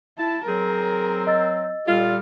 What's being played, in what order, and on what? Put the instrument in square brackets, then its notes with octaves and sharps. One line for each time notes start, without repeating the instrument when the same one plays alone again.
[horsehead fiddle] E4 [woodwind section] A5
[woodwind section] F#3 C4 [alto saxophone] G#4 [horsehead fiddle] A#4
[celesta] D#5 E6 A6
[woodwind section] A#2 A4 F6 [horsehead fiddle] G3 [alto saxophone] F4